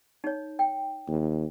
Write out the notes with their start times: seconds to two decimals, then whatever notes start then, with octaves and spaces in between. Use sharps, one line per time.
0.24 D#4 C#5
0.59 G5
1.08 D#2